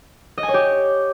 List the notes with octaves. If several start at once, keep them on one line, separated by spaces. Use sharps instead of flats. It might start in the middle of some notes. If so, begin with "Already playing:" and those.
D#5
G#5
C#5
G4